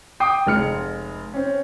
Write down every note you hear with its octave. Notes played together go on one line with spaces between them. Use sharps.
G5 D6 D#6 C7
F1 G#3 F6 C#7
C4 C#4